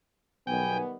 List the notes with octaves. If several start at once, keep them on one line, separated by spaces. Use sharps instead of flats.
B1 D#3 G3 B3 G5 G#5